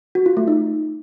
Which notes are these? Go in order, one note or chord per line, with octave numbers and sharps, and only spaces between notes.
F#4
F4
A3
D#4